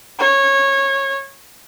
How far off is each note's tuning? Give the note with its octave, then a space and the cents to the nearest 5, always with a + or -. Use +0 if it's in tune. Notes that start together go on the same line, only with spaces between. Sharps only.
C#5 -20